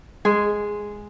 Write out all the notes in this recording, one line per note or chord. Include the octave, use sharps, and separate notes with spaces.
G#3 G#4